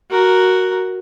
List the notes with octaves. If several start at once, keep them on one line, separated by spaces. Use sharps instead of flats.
F#4 A#4